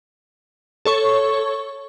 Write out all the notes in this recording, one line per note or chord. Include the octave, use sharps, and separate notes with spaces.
A4 C#5 C#6